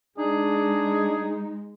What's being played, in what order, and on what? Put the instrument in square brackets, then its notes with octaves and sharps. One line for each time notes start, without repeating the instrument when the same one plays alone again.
[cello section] G#3 [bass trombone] D4 [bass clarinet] D#4 [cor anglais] G#4